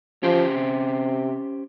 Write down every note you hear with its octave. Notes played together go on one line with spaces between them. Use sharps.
F3 C#4 G4 C5
C3